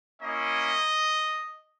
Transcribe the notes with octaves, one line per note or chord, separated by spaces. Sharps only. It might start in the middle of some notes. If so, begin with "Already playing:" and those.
A#3 C#4 E4 D#5